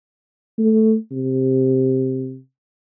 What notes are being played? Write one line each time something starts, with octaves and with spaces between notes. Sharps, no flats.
A3
C3